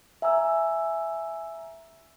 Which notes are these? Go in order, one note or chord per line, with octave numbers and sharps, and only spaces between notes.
E5 G#5 A#5 E6